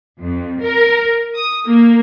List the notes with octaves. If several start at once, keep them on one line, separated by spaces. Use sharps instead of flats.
F2
A#4
D#6
A#3